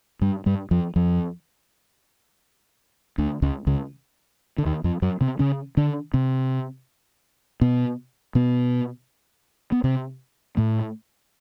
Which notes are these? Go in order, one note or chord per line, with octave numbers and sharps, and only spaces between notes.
G2 G3
G2 G3
F2 F3
F2 F3
D2 D3
C#2 C#3
C#2 C#3
D3
D#2 D#3
F2 F3
F#2 F#3
C3 C4
C#3 C#4
D3 D4
C3 C4
B2 B3
B2 B3
B3
C3 C4
A2 A3